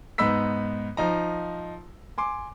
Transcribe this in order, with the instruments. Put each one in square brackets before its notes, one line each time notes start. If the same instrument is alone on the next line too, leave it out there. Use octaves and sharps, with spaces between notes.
[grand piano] G#2 B3 D#4 B5 E6 B6
F3 D#4 A#5
G#5 C6 D6